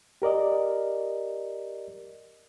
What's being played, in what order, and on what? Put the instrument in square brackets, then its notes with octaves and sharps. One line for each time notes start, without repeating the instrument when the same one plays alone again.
[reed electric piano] G4 A#4 D5 D#5